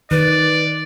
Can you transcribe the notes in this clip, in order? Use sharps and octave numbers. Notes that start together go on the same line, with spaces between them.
D#3 B4 D5